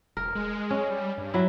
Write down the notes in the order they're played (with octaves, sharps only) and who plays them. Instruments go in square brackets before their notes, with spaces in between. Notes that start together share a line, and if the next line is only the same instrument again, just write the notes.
[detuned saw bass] E1 [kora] A#4
[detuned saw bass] G#3
[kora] C#4
[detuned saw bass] G3
G2
[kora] F#3 E4